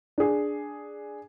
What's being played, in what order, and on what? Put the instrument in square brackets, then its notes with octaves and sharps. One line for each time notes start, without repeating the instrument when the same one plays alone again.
[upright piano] D4 G#4